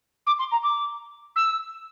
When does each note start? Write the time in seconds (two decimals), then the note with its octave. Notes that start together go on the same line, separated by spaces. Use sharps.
0.26 D6
0.39 C6
0.52 A#5
0.63 D6
1.36 E6